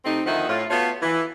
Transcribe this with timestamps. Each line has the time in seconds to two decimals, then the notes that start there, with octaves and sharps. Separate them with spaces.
0.05 C3 A3 C4 D#4
0.26 D2 D#3 F3 D#4 E5 F#5
0.49 A2 F4
0.70 A3 B3 F4 F#4 C#5 F5
1.02 E3